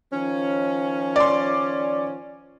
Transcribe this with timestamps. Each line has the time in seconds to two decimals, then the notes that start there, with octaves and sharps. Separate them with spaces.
0.13 D#3 F3 C#4
1.16 D5 C6